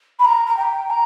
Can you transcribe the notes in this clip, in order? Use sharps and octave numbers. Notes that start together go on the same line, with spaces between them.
B5
A#5
A#5
G5
A#5